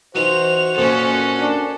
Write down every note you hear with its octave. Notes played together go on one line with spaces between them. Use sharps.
E3 D#4 F4 F#4 C5 F7
F2 A#2 C#4 A4
D4